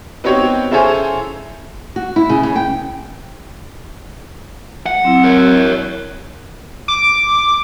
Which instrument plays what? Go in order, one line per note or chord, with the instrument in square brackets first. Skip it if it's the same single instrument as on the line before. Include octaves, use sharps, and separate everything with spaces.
[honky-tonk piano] B3 C4 D#4 F#4 G4 C#5
C#3 E4 A4 C5 C#5 G#5
[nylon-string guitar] F#4
E4
C#3
C#3
G5
[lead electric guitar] F#5
[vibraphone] F#3 C4 E4
[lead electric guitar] A#4 C#5
[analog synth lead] D6